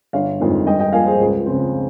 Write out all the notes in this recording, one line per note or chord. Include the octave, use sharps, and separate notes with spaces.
G1 C#5 F5
F2 D#3 G#3 C4
G2 D#5 G5
D#5 G5
F3 A#3 F5 G#5
G#4 C5
C#2
C#3 F3 C4